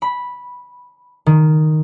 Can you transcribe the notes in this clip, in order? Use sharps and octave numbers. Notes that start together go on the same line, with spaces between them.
B5
D#3